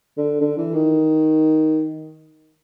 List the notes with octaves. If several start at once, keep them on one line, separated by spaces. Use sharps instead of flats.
D3
D3
E3
D#3